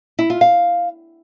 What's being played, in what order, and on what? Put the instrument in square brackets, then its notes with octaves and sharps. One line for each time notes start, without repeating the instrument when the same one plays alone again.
[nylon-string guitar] E4
F4
F5